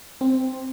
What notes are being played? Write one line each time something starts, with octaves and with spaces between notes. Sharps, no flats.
C4